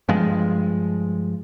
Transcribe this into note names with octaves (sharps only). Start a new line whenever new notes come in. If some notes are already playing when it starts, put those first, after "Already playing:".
G2 F3 G#3